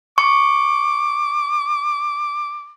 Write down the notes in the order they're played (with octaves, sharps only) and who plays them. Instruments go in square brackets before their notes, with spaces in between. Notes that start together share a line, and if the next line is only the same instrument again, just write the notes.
[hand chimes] C#6 [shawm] D6